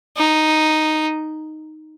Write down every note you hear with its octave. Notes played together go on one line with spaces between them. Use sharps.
D#4